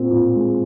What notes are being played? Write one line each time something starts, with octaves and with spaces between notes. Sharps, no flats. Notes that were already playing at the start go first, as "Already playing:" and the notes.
Already playing: A#2 C4
A#2
G#3